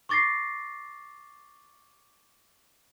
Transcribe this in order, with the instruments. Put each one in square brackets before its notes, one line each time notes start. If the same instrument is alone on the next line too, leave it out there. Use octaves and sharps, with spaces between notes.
[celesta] C#6 D6 A6 A#6 C7